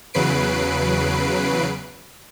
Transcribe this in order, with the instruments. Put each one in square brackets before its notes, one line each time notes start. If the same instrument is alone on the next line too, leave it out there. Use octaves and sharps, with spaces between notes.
[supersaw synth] E2 C#3 F#3 B4 C7 D7